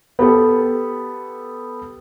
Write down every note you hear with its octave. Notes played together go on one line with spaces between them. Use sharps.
B3 G4 A4